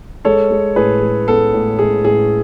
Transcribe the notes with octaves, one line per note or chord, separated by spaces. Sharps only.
G#3 A4 C#5
G#3
A2 G#4 B4
G#3
B3 A4
A2
G#3 G#4
A2 G#4